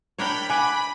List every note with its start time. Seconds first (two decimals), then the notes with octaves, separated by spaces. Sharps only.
0.18 D4 A#4 C#5 G5 B5
0.50 F#5 G#5 B5 D6